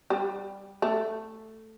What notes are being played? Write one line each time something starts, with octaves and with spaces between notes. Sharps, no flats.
G3
A3